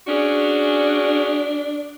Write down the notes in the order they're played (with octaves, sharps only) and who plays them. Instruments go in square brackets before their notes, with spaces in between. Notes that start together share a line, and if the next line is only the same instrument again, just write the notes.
[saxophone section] C#4 F#4 G#4 [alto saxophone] D4